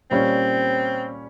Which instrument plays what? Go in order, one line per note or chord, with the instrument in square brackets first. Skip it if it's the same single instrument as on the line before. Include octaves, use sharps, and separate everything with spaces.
[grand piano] A#2 G3 C#4 [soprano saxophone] C4